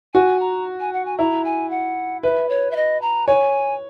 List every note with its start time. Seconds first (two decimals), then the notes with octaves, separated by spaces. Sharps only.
0.14 F#4 G#5
0.41 A#5
0.80 G#5
0.93 F#5
1.05 G#5
1.18 E4 A#5
1.45 G#5
1.70 F#5
2.23 B4 E5
2.49 C#5
2.71 E5
2.76 D#5
3.02 A#5
3.27 C#5 G#5